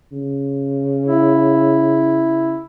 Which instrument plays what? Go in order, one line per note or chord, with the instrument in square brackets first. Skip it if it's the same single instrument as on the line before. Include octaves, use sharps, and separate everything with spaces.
[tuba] C#3
[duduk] E4